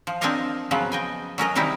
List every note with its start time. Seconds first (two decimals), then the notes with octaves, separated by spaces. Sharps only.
0.07 F3
0.21 C4 D4 A#4 C#5 D#5 F5
0.71 C#3 F3 F#3 B3
0.92 D#5 G5 G#5
1.38 F#3 C#4 A#4 D#5
1.55 C3 D#3 G3 D#4 E4